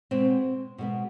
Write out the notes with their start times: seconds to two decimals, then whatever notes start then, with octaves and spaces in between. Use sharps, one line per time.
0.11 B2 G#3 B3 C4
0.78 B2 G#3 B3